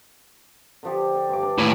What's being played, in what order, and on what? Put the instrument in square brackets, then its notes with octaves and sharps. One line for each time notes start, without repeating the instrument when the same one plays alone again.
[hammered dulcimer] D3 F3 G4
A4
G2 G#5 D6
D4
[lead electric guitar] D#2 A2